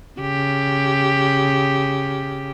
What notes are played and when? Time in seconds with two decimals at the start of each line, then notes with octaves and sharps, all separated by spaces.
0.20 C#3 G4